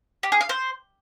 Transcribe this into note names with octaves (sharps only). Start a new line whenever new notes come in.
G4
G#4
F5
C5